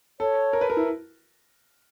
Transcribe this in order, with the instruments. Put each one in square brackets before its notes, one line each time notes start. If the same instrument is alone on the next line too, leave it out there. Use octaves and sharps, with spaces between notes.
[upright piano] A4 [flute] C#5
[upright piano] A#4
B4
A#4
E4